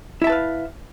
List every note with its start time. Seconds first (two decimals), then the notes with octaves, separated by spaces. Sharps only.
0.22 E4
0.24 E5
0.27 A5
0.30 B4
0.32 F5